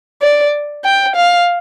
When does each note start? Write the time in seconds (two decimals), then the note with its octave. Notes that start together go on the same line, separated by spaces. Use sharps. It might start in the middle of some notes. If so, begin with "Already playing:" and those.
0.22 D5
0.84 G5
1.15 F5